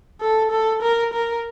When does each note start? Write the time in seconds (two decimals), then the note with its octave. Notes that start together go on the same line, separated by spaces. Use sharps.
0.21 A4
0.51 A4
0.82 A#4
1.14 A#4